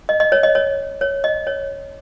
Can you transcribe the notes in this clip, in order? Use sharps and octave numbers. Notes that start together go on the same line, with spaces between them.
D#5
D#5
C#5
D#5
C#5
C#5
D#5
C#5